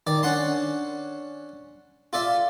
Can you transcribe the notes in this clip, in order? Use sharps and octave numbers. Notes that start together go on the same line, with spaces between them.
D#3 D5 D6
C#4 D4 F#5 A5 C6
F4 A4 D5 E5